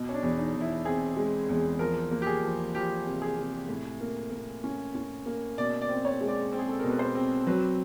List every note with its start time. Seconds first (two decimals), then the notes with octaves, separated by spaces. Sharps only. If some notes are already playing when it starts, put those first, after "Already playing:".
Already playing: B2
0.09 C#4
0.14 D4
0.23 E2
0.39 D#4
0.54 E2
0.61 E4
0.85 C4 G#4
1.17 G#3
1.49 E2
1.79 F3 A#4
2.11 A#3
2.22 G4
2.27 G#4
2.43 F3
2.75 F3 G4
3.06 C3
3.22 G#4
3.38 C3
3.69 A2
4.01 A#3
4.32 A#3
4.64 C#4
4.95 C#4
5.26 A#3
5.58 B2 D5
5.82 D5
5.89 C4
6.05 C#5
6.21 G#3
6.28 D5
6.53 C4
6.59 G#4
6.69 A4
6.79 B2 A#4
6.90 B4
6.99 C5
7.15 C4
7.47 F#3 B4